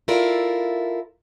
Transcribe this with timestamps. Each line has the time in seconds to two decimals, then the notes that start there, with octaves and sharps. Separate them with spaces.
0.08 E4 F4 A4 A#4 D5 F5